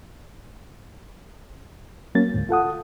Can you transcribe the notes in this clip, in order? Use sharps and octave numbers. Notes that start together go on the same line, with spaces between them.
F#3 A#3 C#4 A6
D2 G#2
F4 A4 F#5 D#6